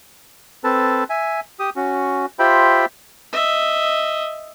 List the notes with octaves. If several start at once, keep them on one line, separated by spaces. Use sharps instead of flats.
C4 A4 B4 A5
E5 G#5
G4 D#6
C#4 F#4
F4 G4 C5 E5 G5 B5
D#5 E5